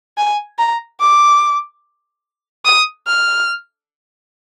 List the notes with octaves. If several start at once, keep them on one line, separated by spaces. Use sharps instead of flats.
G#5
A#5
D6
D#6
F6